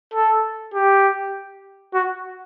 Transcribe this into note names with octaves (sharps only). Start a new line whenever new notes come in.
A4
G4
F#4